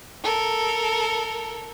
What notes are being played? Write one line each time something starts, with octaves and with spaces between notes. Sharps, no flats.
A4 A#4